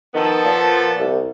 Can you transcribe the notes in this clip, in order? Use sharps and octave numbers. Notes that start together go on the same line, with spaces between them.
D#3 F3 B3 A4
A#2
C2